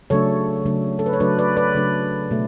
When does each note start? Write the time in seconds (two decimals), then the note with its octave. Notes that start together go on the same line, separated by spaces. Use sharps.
0.10 C#3 F#3 A3 D4 A4 C#5
0.66 C#3 F#3 A3 D4
0.99 A4
1.06 B4
1.13 C#5
1.20 C#3 F#3 A3 D4 B4 D5
1.39 B4 D5
1.57 B4 D5
1.75 C#3 F#3 A3 D4
2.31 B2 A3